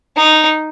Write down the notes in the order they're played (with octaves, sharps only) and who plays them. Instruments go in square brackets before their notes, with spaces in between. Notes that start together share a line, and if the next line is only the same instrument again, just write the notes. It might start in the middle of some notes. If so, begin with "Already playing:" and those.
[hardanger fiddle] D#4